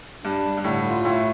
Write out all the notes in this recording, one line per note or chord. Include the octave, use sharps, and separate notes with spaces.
G2 D4
G3
G2
A2 D3
F4
A2 A3